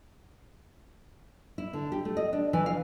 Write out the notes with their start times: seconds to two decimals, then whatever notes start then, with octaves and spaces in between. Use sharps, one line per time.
1.58 E4
1.73 D3
1.92 G4
2.05 A3
2.17 D#5
2.33 D4
2.53 E3
2.66 F5